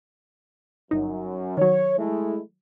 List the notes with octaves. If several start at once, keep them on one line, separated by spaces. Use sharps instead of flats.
G1 F#2 D#4
D#3 F#3 C#5
G#3 A3 E4